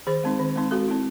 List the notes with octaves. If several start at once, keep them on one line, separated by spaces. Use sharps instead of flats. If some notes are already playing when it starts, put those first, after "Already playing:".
D#3 G#4 C5
G#3 C4 D#4
D#3
G#3 C4 D#4
G#3 F#4 A4
C4 E4